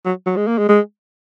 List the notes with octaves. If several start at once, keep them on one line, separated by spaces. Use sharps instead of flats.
F#3
F#3
G#3
A#3
G#3
G#3